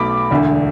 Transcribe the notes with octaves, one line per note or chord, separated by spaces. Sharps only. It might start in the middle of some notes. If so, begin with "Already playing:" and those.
Already playing: B1 B2 A3 B5 D6
E1 D2 D3